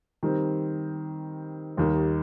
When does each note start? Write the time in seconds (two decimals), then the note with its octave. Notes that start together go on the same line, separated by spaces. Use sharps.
0.23 D#3 G3 C4
1.77 D#2 D#3 G3